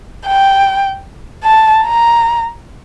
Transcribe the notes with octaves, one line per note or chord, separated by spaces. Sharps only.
G5
A5
A#5